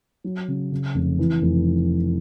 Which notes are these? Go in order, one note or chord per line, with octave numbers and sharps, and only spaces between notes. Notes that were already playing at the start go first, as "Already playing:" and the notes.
F#3
C#3
C#3
F1
E3
F1